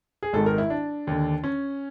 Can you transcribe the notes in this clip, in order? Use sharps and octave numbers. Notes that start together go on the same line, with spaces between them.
G#4
G#1 G#2 D#3 A4
A#4
E4
D4
D#2 D3
C#4